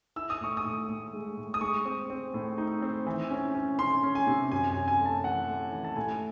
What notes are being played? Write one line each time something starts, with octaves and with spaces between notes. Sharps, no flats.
E4 E6
D#6
A2 C#6
D#6
A2
A2
G#3
A2
D#6
G#3 C#6
C4
C4
A2
D#4
C4
E3
C#4
C#4
C#4 C6
C#4
G#5
C3
F#2 G#5
G#5
F#2
G#5
A3
A5
E3 F#5
A3
E3
A5
A2 G#5